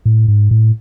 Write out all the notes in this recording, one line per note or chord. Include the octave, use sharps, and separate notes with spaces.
A2
G#2
A2